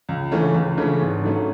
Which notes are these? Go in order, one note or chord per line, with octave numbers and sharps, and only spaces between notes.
C#2
C#3 E3 A3 C#4
C#2
C#3 E3 A3 C#4
G#1
G#2 F#3 A3 C#4